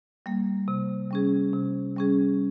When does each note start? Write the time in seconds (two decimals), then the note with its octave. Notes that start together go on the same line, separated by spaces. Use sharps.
0.26 G3 A#3
0.68 C3
1.11 G3 C#4 G#4
1.54 C3
1.96 G3 C#4 G#4